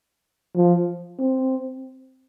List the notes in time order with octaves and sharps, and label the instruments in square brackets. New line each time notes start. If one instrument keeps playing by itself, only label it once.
[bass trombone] F3
C4